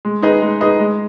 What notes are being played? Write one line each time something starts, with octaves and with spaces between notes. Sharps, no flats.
G#3
D#4 G#4 B4 D#5
G#3
D#4 G#4 B4 D#5
G#3